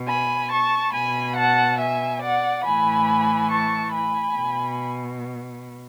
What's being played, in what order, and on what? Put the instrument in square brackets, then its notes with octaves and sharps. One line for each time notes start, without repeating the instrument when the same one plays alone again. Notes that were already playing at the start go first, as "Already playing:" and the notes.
Already playing: [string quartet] B2
G#5 B5
A5 C#6
B2 G#5 B5
F#5 A5
E5 G#5
D5 F#5
A2 E3 G#5 B5
A5 C#6
G#5 B5
B2